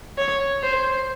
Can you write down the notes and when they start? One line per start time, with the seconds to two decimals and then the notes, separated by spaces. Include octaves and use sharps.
0.18 C#5
0.63 C5